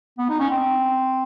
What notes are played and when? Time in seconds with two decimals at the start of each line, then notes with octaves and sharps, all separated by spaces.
0.18 B3
0.29 D#4
0.40 C#4
0.50 C4